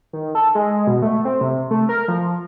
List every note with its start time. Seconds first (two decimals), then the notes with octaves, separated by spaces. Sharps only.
0.13 D#3
0.35 A4
0.55 G#3
0.87 B2
1.02 A3
1.25 C4
1.41 C3
1.71 A3
1.89 A#4
2.08 F3